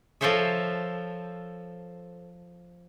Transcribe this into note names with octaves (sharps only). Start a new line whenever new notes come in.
F3 A4 A#4 C5 C#5 E5